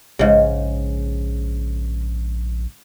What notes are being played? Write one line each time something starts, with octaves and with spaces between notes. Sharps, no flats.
A#1 G#2 C#3